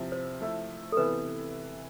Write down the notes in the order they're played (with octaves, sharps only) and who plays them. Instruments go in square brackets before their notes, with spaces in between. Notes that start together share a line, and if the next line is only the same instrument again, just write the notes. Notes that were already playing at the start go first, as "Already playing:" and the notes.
Already playing: [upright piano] C3 F3 C4 E4
[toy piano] C5
[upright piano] F3 A3 E4
[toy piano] A4
[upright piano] C3 E3 B3 E4 [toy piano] B4